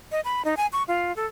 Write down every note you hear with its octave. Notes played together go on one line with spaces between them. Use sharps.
D#5
B5
D#4
G#5
C#6
F4
A4